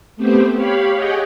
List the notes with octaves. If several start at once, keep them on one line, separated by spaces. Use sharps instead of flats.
A3 B3 C4 G4 C5
G4 C#5 F5 B5
G4 G#4 C#5 D#5 F#5 G5